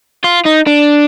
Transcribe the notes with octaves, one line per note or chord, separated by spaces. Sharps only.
F4
D#4
D4